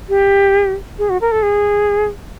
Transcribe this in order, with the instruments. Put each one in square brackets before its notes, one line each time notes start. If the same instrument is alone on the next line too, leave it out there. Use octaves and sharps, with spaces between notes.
[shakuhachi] G4
G#4
F#4
A#4
A4
G#4